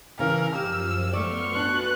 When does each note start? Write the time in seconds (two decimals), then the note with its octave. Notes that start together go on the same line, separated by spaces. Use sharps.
0.19 C#3 E3 A#4 F6
0.55 F#2 F3 G4 E6
1.13 A3 B3 D5 C6 C#6 F6
1.56 D4 F#4 B4 F#6 A6